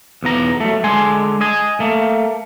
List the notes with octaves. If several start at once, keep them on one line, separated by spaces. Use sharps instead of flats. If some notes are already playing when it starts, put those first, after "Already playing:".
B1 E2 B3 A#5
F#3 A3
D3 G#3 G#5 C6
D#5 G#5
A3 A#3